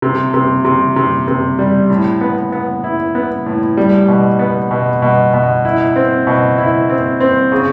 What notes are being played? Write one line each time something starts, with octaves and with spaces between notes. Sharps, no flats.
C3
C3
C3
C3
C3
G3
A2
B3
B3
E4
B3
A2
G3
B2
B3
B2
B2
B2
E4
C4
B2
E4
C4
C4
C#3